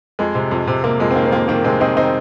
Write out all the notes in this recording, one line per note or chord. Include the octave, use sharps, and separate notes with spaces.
F2 G#3
C3
F2
C3
C3 A#3
F2 G#3
C4
D#3 A#3
C4
F2 A#3
D#3 A#3
C3 G#3 C4
D#3 C4 D#4
D#3 C4 D#4